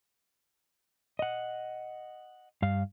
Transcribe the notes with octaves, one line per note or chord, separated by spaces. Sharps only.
D#5 F#5
G2 F5